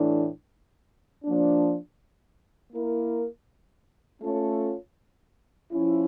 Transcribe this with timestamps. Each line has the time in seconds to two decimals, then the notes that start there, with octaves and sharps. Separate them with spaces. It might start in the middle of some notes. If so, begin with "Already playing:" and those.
Already playing: A2 E3 A3 D4
1.23 F3 A#3 D4
2.73 A#3 E4 A#4
4.21 A3 C#4 F4 A4 C#5
5.71 F3 C#4 E4